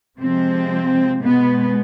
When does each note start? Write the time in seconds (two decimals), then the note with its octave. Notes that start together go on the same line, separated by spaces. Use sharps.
0.21 C3 F3 G#3 C4
1.21 B2 G#3 B3